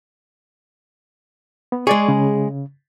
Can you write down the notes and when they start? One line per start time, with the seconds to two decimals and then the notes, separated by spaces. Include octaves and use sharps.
1.72 B3
1.87 G#3 G#4 D5 C#6
2.09 C#3